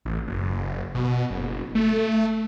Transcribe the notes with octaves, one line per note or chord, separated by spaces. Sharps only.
A1
F#1
B2
F#1
A3